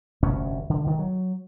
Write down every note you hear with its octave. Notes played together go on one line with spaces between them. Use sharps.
F1 D2 G2 C#4
D3
D2 D#3
F#3